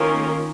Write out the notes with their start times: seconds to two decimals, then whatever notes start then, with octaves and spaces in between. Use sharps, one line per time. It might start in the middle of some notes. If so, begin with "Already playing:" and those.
Already playing: D#3 A#3 C#4 F4 A#4